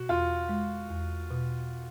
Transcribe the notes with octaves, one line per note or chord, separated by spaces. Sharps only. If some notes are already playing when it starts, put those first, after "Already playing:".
Already playing: B2 F#4
E2 F4
G#3
E2
B2